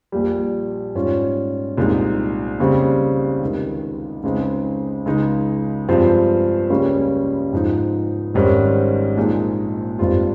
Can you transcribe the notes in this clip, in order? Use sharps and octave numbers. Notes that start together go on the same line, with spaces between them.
A#1 A#2 G3
G#2 G3 C#4 F4
C2 A#2 G#3 D#4
D#2 C#3 G3 C4
C#2 C3 D#3
C#2 C#3 G#3 C4 D#4
C#2 C#3 G#3 D#4
G2 F3 G#3 C4
C#2 C#3 G3 A#3 C#4
G#2 F3 G#3 D#4
G#1 G#2 D#3 G3 C#4
A#1 A#2 G#3 D#4
G#1 G2 G3 C4 F4